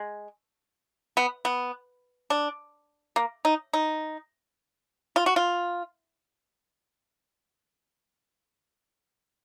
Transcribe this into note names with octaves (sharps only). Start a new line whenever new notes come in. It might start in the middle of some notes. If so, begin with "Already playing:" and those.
Already playing: G#3
B3
B3
D4
A#3
D#4
D#4
F4
F#4
F4